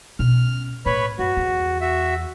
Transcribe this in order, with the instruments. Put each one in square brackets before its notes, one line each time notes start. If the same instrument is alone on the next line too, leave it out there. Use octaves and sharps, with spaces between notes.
[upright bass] B2 C#4 [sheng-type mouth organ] F6
[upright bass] A2 [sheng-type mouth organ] B4 C#5 B5
[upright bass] F#2 [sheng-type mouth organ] F#4
[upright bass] E2
[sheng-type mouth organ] F#4 E5